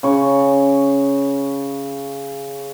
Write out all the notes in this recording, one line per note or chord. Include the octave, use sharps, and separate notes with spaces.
C#3 C#6